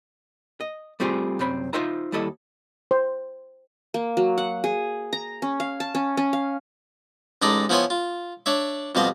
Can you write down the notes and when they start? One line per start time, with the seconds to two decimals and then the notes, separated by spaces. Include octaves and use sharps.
0.61 D#5
1.00 G3 A3 C4 F4 G4 G#4
1.39 C2 F#2 C4 B5
1.73 D#4 F4 C5 E5 A#5
2.12 D#2 G3 E4 A4 D#5
2.91 C5
3.94 A#3
4.17 F#3
4.38 F#5
4.64 G#4
5.13 A#5
5.42 C#4
5.60 F5
5.80 A5
5.95 C#4
6.17 C#4
6.33 F5
7.42 A1 G#3 D#4 A4 D5 D#6
7.69 F3 B3 E4 C#5 G#5 C6
7.90 F4
8.46 D4 C#5 E5
8.95 F2 B2 G3 F5 C6